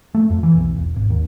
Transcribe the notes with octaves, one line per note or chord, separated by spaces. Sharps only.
A3
F2
E3
B1
E1
G#1
D#2